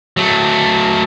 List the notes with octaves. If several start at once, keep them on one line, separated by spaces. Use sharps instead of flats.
F#3 A3